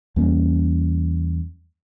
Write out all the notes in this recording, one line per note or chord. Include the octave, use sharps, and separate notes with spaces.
E2 G3 A#3 C#4